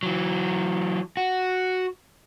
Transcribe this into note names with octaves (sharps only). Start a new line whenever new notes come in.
E3 F#3
F#4